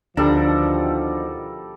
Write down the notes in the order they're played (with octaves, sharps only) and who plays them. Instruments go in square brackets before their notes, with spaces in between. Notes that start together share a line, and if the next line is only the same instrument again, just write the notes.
[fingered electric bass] D2 [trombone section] B2 D#3 F3 [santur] G3 A4 A#5 [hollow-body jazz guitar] D4